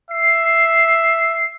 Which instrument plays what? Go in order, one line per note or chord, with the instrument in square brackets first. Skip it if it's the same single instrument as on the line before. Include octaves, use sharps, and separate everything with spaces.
[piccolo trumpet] E5 [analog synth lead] C7